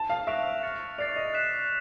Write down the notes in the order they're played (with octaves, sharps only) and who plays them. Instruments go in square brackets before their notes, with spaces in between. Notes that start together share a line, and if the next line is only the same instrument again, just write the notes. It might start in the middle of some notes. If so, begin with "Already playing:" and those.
Already playing: [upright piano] A5
F5
[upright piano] E5 [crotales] C#6 F#6 A#6 D7 F7
[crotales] F6 A6 C#7
[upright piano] D5 [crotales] A6 C7 F7
[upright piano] D#5
[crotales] F#6 B6 E7